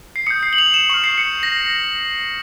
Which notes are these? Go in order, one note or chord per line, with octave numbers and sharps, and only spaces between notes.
C7
D#6 G6 C#7
C7
F#7
F7
E7
C#6 F6 C#7
C7
C#7
A#6